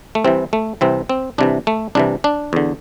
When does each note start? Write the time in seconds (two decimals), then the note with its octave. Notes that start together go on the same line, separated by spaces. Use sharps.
0.15 A3
0.24 C2 C3 E3 C4
0.53 A3
0.81 C2 C3 E3 C4
1.09 C4
1.38 C2 C3 E3 D4
1.67 A3
1.95 C2 C3 E3 D4
2.24 D4
2.53 E2 D3